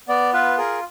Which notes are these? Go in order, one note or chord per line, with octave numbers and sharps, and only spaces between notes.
B3 D5
F4 B4
G#4 A#4